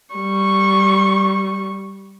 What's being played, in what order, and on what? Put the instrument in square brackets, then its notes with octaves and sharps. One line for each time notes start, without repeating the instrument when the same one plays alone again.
[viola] G3 C#6